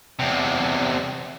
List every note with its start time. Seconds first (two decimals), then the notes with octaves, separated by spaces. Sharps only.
0.19 E2 C3